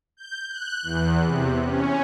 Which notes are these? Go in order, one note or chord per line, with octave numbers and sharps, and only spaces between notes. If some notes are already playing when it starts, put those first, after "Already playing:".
G6
F#6
E2
C3
C#4